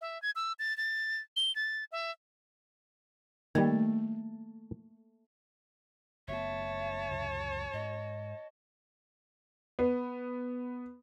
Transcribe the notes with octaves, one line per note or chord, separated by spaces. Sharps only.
E5
G#6
E6
A6
A6
G7
A6
E5
D#3 G3 A3 A#3
F#1 A3 B3 C#5 E5 A5
C#2 F#2 C3
G#2 D#5
B3